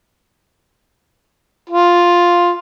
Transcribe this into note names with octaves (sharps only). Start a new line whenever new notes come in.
F4